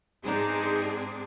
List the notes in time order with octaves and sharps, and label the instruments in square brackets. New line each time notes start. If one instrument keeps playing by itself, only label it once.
[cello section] G#2 C4 D4 [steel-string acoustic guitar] B3 A5 A#5 [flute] D#4 [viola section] G#4